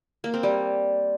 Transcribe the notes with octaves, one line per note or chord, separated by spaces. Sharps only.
A#3
C4
G3